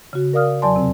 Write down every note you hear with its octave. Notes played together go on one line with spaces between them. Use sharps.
C#3 F#4
A#4 D5 F5 D#6 F6
E2 F#3 D5 G#5 A5 C6
F2 C3 C4